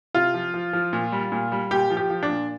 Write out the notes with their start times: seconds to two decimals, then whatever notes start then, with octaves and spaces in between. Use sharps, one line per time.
0.15 C3 F4
0.34 F3
0.54 F3
0.73 F3
0.93 A#2
1.12 G3
1.32 A#2
1.52 G3
1.71 A#2 G4
1.90 F3
1.97 G4
2.10 F3
2.23 D4
2.29 A#2